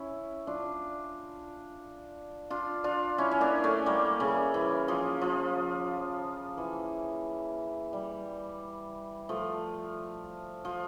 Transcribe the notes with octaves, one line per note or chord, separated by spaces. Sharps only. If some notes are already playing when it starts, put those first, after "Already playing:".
Already playing: C#4 E4
D4 F4
D4 F4
D4 F4
C#4 E4
C#4
A#3 D4
A3 C#4
G3 A#3
C#3
E3
F3
F3
E3
G3
F3 A3
F3